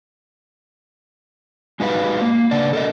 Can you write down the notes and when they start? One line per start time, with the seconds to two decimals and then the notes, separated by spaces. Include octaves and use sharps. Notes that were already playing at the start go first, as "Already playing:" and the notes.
1.80 G#3 D#4 F#4 B4 F5
2.21 A#3
2.51 C#3 B3 D4 D5
2.73 A4 A#4 D#5